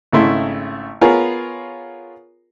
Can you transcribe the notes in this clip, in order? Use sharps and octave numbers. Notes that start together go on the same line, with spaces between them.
G#1 C#3 A3 E4 C6
B3 F4 G#4 A#4 C#5